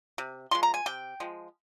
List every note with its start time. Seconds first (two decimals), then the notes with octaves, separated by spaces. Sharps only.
0.18 C3
0.51 F3 G#3 C6
0.63 A#5
0.74 G#5
0.86 C3 G5
1.20 F3 G#3